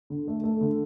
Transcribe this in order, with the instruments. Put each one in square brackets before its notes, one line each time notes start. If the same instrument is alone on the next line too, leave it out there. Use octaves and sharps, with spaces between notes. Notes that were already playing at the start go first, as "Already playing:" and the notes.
[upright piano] D3
A3
A3
D3